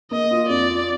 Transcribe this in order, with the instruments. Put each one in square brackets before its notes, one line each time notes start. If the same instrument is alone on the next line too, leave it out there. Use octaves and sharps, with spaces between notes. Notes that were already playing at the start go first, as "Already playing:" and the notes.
[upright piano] A#3 [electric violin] D#5
[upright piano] F4
[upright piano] F2 [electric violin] D5
[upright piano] F4